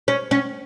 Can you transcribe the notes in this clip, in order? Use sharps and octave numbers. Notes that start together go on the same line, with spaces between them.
C#4
C#4